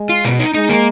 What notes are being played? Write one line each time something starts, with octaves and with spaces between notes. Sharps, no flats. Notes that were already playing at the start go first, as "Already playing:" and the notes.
Already playing: G#3
F4
B2
D#4
G#3 D#4
A#3